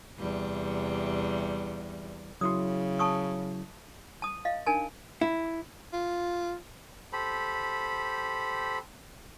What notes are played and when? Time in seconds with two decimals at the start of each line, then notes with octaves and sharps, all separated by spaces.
0.19 E2 C3 G3
2.41 C#3 F#3 E4 F#4 D#6
2.99 A5 C#6 D#6
4.22 A5 D#6
4.45 D#5 F5
4.67 D4 D#4 A#4 G#5 A5
5.21 E4
5.93 F4
7.13 G4 A4 C5 B5